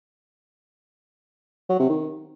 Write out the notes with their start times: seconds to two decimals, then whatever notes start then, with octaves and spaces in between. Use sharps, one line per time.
1.69 F#3
1.79 C3
1.89 D#3